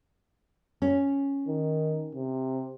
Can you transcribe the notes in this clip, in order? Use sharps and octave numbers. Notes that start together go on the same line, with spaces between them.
C#4
D#3
C3